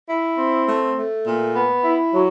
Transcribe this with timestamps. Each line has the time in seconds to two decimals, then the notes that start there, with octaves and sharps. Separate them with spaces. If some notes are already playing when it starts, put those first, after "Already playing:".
0.09 E4
0.38 C4
0.68 A3
0.97 A3
1.26 A#2
1.56 B3
1.84 E4
2.14 F#3